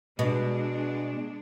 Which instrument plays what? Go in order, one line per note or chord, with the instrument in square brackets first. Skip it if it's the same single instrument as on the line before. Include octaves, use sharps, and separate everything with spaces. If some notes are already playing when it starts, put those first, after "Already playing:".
[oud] B2 [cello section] G#3 D4